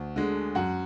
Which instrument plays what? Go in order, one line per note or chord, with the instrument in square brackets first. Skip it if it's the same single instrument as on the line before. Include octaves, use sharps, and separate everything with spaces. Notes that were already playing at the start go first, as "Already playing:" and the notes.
Already playing: [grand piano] D2
D3 G#3
F#2 F#5